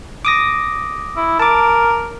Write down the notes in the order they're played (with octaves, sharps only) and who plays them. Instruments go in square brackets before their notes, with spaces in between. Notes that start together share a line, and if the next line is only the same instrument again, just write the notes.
[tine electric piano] D6 D#6 A#6
[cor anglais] E4
[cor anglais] A#4 [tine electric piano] A5 D6